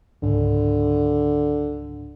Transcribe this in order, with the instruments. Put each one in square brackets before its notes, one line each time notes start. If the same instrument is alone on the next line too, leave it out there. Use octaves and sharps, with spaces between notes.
[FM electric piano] C#2 G#2 [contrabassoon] D3